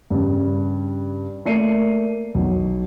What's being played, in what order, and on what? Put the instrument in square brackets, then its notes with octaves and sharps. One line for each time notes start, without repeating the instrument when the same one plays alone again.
[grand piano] G2 C#3
A3 A#3 D5 C7 C#7 D#7
B1